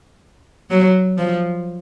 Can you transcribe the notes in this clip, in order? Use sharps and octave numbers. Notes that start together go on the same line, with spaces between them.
F#3
F3